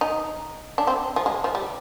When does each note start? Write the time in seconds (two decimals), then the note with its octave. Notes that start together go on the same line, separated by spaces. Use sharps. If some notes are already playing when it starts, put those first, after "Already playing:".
0.01 D#4
0.78 D4
0.87 C4
1.16 F3
1.26 G#3
1.44 F3
1.55 G3